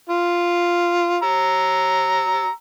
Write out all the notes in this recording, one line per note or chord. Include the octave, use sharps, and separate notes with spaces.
F4
A#5 E6